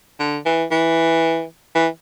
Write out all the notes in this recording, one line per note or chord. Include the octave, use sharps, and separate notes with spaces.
D3
E3
E3
E3